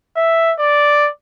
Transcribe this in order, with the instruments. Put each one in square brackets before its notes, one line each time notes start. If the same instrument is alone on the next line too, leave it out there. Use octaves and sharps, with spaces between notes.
[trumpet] E5
D5